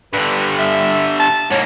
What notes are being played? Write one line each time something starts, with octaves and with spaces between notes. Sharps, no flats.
G2 D3 B4
E5
A5
G#2 A#3 C#5